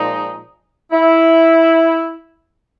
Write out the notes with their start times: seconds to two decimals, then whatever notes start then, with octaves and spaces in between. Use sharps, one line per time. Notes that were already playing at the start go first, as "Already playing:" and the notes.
Already playing: A#2 F3 G#3 D#4
0.93 E4